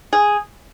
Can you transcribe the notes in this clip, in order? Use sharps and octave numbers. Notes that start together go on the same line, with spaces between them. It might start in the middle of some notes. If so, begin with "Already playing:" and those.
G#4